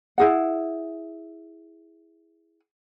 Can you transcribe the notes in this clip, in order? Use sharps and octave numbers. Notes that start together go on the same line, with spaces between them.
E4 G#4 F#5